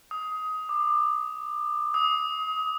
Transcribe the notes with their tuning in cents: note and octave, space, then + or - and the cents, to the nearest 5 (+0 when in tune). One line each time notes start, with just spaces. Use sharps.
D#6 +15
D6 +30
D#6 +30